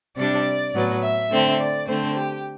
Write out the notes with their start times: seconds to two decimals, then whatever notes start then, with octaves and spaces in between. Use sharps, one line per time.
0.17 C3 G3 D4 D5
0.74 A2 F#3 B3
1.02 E5
1.31 D3 A3 C4
1.59 D5
1.88 D3 A3 C4 C5
2.16 G4